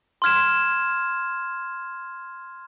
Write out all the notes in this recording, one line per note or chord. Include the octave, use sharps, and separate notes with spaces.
C6 F6 G#6 E7